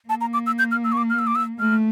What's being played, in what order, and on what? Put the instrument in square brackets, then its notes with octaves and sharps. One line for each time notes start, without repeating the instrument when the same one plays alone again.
[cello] A#3 [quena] A5
[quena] A#5
D6
E6
G6
F6
E6
C#6
D6
F6
E6
D6
E6
[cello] A3 [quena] F6